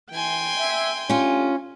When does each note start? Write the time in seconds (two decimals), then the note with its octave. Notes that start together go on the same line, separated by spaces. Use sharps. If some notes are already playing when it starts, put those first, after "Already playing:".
0.12 E3 G5 G#5 C6
0.58 E5
1.09 A3 C#4 D4 F4 G4